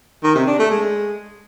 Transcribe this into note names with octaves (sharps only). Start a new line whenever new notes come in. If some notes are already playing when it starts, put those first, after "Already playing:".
D#3
C3
D4
A3
G#3